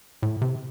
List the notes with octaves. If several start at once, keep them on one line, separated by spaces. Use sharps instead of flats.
A2
C3